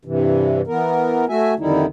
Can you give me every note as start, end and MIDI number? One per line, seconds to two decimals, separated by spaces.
0.05 0.61 43
0.05 0.61 48
0.05 0.61 52
0.67 1.25 52
0.67 1.25 59
0.67 1.25 70
1.29 1.54 57
1.29 1.54 66
1.29 1.54 76
1.29 1.54 80
1.59 1.86 41
1.59 1.86 50
1.59 1.86 51
1.59 1.86 55
1.59 1.86 63
1.59 1.86 64